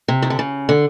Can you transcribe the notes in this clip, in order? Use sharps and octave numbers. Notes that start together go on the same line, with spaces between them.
C3
D#3
D3
C#3
D3